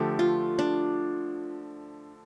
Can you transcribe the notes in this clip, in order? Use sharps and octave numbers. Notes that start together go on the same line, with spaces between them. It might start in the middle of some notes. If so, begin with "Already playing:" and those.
Already playing: D3 F3 A3 G4
F4
D4